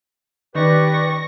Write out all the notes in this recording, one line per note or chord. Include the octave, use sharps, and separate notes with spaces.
D#3 G4 B4 D5 C#6 A#6